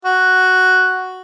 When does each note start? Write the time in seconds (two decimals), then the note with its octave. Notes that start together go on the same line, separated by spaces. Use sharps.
0.05 F#4